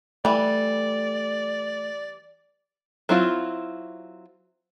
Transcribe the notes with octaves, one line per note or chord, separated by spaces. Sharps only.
E3 G3 A3 D5
F#3 C4 E4 F4